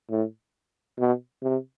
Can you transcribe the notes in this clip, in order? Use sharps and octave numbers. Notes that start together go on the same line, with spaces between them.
A2
B2
C3